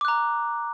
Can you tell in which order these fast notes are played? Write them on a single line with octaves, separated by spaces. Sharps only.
D6 F#6 A#5